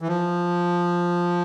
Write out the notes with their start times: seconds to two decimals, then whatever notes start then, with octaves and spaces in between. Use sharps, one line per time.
0.01 E3
0.08 F3